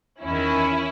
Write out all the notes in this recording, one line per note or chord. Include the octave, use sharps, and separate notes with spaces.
E2 D#3 C#4 E4